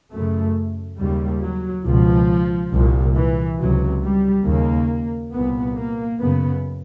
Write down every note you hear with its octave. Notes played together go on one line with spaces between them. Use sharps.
F#2 C#3 A3
D#2 C#3 G3
F#3
C#2 B2 F3
C2 A#2
E3
C#2 C3 F#3
G3
D#2 C#3 A#3
C2 A#2 B3
A#3
F#2 C#3 B3